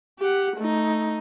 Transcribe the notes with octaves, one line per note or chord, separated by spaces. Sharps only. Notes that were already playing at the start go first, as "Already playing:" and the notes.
G4 F#5
A3 D#4